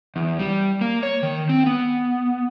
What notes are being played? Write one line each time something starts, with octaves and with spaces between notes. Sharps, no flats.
E2
G3
A#3
C#5
D#3
C4
B3